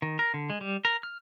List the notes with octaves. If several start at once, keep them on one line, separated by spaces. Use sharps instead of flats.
D#3
A#4
D3
G#3
G3
A#4
F6